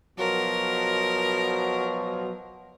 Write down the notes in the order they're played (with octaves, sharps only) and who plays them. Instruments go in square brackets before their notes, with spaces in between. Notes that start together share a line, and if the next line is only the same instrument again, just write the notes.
[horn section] B2 F3 F#3 [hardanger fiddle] A#4